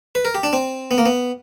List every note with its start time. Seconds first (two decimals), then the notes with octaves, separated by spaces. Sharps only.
0.15 B4
0.25 A#4
0.35 G4
0.43 D4
0.53 C4
0.91 B3
0.98 A#3
1.06 B3